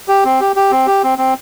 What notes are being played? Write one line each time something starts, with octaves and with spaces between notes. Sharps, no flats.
G4
C4
G4
G4
C4
G4
C4
C4